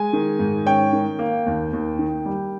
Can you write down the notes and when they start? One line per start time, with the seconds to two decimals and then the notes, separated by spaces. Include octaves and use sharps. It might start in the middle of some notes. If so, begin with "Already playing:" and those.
Already playing: G#3 G#5
0.13 D#3
0.39 G#2
0.66 C#4 G5
0.93 D#3
1.19 A#3
1.46 D#2
1.73 D#2
1.99 D#3
2.26 G3